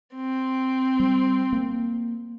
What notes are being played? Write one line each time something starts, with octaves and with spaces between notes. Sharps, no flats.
C4
G3
A#3